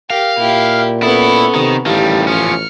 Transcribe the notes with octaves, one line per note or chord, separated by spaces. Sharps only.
G4 A#4 F5
A#2 E4 G4
B3 C#4 E4 A4 D#6
C3 D#3
A1 D#3 G3 E4 G4 F5 A5
F3 C#4 F4 F6 C#7